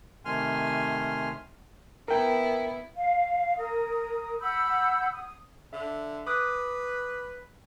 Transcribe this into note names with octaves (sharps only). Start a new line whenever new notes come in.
C3 D#3 A3 G#5 C6 F6
B3 E4 A#4 G5
F5
A#4 D#6
F#5 B5 E6 G6
D#6
D3 E5
B4 D6 D#6 F#6